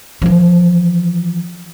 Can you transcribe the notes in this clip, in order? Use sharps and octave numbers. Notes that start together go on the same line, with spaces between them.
E3 F3